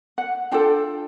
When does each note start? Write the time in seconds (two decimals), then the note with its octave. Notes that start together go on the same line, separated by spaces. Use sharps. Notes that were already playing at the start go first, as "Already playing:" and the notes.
0.18 F#5
0.52 D4 F4 A4 G5